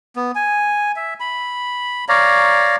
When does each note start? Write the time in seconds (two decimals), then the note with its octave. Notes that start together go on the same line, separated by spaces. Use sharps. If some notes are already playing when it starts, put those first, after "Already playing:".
0.16 B3
0.35 G#5
0.96 E5
1.20 B5
2.09 C#5 D5 F5 A#5